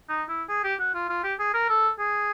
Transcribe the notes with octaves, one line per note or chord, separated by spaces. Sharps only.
D#4
E4
G#4
G4
F#4
F4
F4
G4
G#4
A#4
A4
G#4